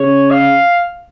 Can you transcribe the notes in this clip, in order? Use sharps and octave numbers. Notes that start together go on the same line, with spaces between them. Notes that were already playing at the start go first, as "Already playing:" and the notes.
Already playing: C#3 C#5
F5